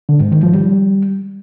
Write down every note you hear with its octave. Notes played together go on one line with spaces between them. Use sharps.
D3
G#2
D#3
F3
G3